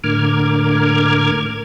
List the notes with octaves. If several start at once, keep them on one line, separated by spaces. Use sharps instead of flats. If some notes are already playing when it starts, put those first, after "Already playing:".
A2 D3 A#4 D6 F6 G#6